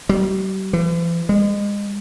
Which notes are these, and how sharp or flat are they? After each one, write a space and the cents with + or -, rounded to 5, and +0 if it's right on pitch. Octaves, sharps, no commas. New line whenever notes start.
G3 -40
E3 +45
G#3 -30